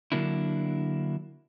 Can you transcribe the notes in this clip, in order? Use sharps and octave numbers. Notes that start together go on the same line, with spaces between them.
D3 F#3 A#3 D4 E4